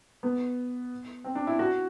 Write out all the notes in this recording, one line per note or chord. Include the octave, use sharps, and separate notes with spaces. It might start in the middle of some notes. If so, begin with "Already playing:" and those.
B3
C4
D4
E4
F#4